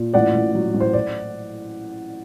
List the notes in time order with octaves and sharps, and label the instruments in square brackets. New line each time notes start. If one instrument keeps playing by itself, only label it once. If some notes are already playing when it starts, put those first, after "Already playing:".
Already playing: [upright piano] A#2
A1 D5 F#5
A1
F#3
A1
C5
D5